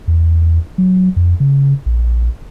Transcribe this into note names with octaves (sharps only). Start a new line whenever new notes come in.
E2
F#3
F2
C#3
A#1